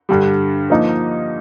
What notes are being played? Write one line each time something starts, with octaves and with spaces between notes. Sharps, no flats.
G2 D3 G3
F3 A#3 D#4